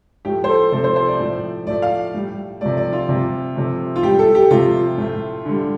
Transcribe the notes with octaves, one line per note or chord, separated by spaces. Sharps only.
A2 F3 A3 G4
C5
A4
C3 F3 A3 A4
C5
C5
D5
A2 F3 A3
A2 F3 A3 D5
F5
A2 G3
C3 F3 A3 D5
D5
F4
C3 G3
C3 F3 A3
F4
A2 G3 G4
A4
G4
C3 F3 A3 F4
A2 A3
D3 G3